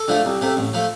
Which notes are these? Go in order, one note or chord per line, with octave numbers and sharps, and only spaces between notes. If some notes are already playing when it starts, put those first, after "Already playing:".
Already playing: A4
D3 F3 A3
C2
C3 A3
A1
F3 A3